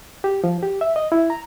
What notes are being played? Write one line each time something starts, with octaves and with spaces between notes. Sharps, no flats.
G4
F3
G4
E5
D#5
E4
A#5